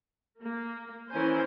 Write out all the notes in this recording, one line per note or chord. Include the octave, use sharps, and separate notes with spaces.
A#3
E3 C#4 E4 A#4 C5 G#5